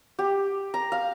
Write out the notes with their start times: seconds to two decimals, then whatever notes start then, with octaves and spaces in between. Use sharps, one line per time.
0.19 G4
0.74 A#5
0.92 F5